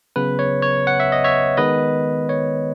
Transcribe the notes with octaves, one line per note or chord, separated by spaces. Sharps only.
C#3 F#3 B3 B4
C#5
C#5
F#5
E5
D#5
C#5 E5
D#3 G#3 B3 B4 D#5
C#5